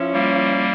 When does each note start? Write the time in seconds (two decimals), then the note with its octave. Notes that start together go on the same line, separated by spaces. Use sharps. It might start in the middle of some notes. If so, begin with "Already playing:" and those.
Already playing: F3 C#4 E4
0.13 G3 A#3